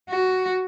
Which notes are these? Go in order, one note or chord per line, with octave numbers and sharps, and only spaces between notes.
F#4